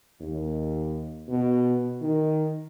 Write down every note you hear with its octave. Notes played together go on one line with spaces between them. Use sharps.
D#2
B2
D#3